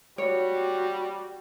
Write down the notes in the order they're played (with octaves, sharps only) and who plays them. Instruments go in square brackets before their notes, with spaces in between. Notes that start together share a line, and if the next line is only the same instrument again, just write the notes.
[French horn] G3 [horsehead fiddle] F#4 [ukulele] C#5